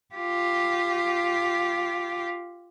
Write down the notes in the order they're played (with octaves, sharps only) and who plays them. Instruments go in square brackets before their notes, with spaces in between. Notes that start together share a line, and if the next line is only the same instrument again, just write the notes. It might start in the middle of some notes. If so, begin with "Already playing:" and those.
[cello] F4 G4